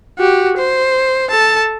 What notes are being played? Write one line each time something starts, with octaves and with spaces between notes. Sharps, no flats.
F#4 G4
C5
A4 A5